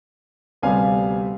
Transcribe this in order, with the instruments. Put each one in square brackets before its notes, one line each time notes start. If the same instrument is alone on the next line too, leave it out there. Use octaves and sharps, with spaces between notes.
[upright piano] D2 C3 G3 B3 F5 G#5